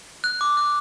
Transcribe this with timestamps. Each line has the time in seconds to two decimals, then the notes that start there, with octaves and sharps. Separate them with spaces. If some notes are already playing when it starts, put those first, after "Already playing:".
0.24 F#6
0.41 D6
0.57 F#6